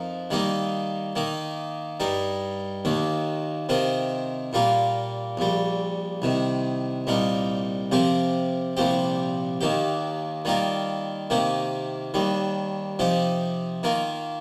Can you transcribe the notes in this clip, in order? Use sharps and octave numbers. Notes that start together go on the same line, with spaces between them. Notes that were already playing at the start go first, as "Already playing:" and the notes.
Already playing: F2 F3 D#4 A#4
D#3 G3 A#3 D#4
D#3 A#3 D#4
G2 G3 D#4 A#4
D#2 D#3 A#3
C3 D#3 C4 F4 A#4
A#2 G3 A#3 F4 A#4
A#1 A#2 G3
C2 C3 D#3
C2 A#2 G3 D#4 A#4
C3 F3 C4 G4 A#4
C2 A#2 F3 C4 G4
D#2 D#3 A#3 G4
D#3 G3 A#3 F4 A#4
C3 D#3 A#3 G4
D#2 D#3 G3
C3 F3 D#4 G4
D#3 A#3 F4 A#4